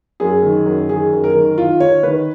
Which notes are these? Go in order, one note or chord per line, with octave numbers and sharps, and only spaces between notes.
F#2 G#4
D#3
F#2
D#3 G#4
F#2
A#4
D#3
D#3 F4
D#3 C#5
D#3 B4